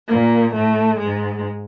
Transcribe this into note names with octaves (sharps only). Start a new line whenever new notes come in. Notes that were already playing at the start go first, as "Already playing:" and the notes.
A#2 A#3
A2 A3
G#2 G#3